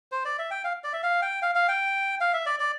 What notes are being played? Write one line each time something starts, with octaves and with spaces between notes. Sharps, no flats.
C5
D5
E5
G5
F5
D5
E5
F5
G5
F5
F5
G5
F5
E5
D5
D5